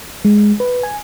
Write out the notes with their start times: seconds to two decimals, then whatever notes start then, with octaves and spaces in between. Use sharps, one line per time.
0.25 G#3
0.60 B4
0.83 G#5